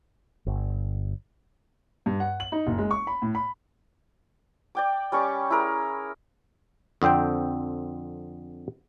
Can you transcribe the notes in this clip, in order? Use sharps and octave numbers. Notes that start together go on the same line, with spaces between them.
G1
G2
F#5
F#7
D#4
F#1
G#3
C#6
B5
A2
B5
D5 G5 D6
G3 C#4 C#6 D6
E4 G#4 A#4
F2 D3 C4 C5 G5